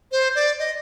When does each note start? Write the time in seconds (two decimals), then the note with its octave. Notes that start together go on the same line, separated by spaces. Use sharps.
0.12 C5
0.35 D5
0.59 D#5